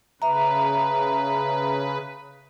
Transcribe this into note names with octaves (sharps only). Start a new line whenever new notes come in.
C#3 B4 E5 A#5